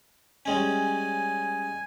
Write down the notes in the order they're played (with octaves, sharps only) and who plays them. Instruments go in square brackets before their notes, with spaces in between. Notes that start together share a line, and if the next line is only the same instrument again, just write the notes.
[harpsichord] G3 G#3 C#4 [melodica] G#5